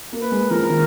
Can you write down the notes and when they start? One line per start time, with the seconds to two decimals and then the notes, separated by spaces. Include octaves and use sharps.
0.13 A#3
0.22 B4
0.31 G#3
0.51 F3 A#4
0.70 D#3